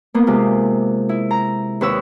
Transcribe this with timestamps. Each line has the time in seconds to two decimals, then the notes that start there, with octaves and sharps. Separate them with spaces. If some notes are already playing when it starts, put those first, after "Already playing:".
0.14 A#3 B3
0.27 C3 G#3 F4
1.09 E4
1.31 A#5
1.81 D#2 C4 B4 C#5 E6